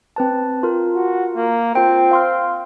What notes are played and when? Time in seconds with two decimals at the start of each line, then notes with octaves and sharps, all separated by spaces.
0.16 C4 B4 A5
0.63 F4 A#4
0.96 F#4
1.36 A#3
1.75 C4 F4 G5
2.11 F5 C6 F6